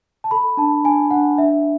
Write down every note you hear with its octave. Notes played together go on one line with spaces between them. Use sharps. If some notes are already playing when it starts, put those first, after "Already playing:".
A5
A4 B5
D4 A5
D4 G#5
D4 F#5
D4 E5